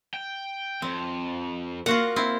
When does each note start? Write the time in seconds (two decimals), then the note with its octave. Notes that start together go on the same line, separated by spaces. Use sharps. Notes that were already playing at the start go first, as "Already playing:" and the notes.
0.14 G5
0.82 F2 C4
1.86 A#3 F4 F#4 F#5
2.16 C4 E4